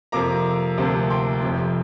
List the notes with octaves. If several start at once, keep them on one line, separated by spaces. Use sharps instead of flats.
F2 C3 A#3 A#5 D6
D2 C3 F3 A#3
G5 C6
F1 F2 C3